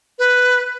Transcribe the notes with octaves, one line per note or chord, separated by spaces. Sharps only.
B4